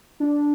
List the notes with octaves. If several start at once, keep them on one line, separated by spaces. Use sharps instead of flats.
D4